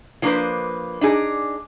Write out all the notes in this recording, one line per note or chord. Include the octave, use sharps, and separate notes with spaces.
F3 A#3 D4 A4 B4 C5
D4 D#4 G#4 D5